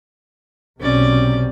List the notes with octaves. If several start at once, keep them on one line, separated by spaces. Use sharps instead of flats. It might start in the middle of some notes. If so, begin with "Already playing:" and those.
B1 C3 C#4 D5